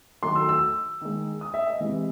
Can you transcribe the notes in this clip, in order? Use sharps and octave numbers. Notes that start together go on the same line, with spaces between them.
D#3 F#3 A3 C6
E6
E6
D#3 G#3
D#6
E5
D#5
C3 E3 G#3